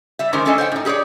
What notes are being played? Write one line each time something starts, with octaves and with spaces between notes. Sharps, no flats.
G3 E5
D#3 G#3 C#4 G4 A#4 C5
A3 C#4 D4 A4 D#5 G#5
C5 C#5 F#5 G5
A2 D#4
G4 G#4 B4 C#5 D5